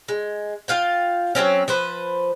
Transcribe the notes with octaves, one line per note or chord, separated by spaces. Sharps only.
G#3
F4 F5 G5
F#3 G3 C4 C#4
F3 B4 C5